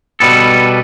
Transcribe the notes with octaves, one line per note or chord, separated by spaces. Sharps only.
B2 G3 B3 A4